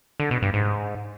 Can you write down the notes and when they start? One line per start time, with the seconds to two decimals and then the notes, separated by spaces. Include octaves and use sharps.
0.20 D3
0.31 B2
0.42 G2
0.54 G#2